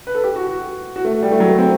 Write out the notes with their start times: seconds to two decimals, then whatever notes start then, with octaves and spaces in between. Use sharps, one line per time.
0.07 B4
0.15 A4
0.24 G4
0.36 F#4
0.47 F#4
0.96 F#4
1.05 A3
1.22 G3
1.31 A3
1.40 F#3
1.49 A3
1.58 C4